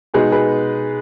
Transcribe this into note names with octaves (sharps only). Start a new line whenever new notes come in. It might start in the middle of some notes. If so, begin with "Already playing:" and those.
B2 G#3 D#4 G#4 B4
G#4 B4